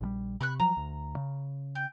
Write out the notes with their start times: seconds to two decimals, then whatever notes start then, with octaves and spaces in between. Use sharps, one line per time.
0.01 A#1 D#3 G3
0.41 C3 B5 C#6 F#6
0.60 F3 F#3 A#5
0.77 D2
1.17 C#3
1.75 G5